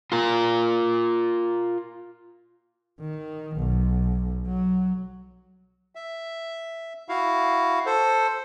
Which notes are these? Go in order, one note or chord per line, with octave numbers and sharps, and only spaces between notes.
F4 A#4
D#3
B1
F#3
E5
E4 F#4 F5
A4 C5